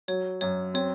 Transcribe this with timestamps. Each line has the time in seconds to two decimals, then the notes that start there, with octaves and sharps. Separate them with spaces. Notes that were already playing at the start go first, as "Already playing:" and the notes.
0.08 F#3 C#5
0.41 F#2 C#5
0.74 C4 C#5